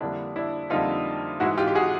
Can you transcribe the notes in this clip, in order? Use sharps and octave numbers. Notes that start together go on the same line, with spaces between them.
F2 D3 G3 A#3 D4 E4
D4 E4
F2 D3 G3 A#3 D#4 F4
G#2 E3 G#3 E4 F#4
F4 G4
G4
F#4 G#4